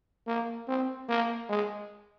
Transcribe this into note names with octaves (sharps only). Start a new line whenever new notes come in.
A#3
C4
A#3
G#3